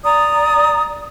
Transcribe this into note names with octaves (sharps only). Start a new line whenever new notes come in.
D5 A#5 D#6